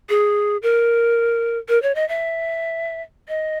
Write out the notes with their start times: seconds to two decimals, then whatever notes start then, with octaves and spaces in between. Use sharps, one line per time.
0.09 G#4
0.62 A#4
1.69 A#4
1.82 C#5
1.95 D#5
2.09 E5
3.28 D#5